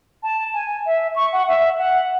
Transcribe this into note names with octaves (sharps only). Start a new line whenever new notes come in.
A5
G#5
E5
C#6
F#5
E5
F#5